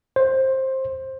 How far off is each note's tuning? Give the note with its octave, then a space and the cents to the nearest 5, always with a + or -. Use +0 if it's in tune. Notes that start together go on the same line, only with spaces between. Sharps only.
C5 +15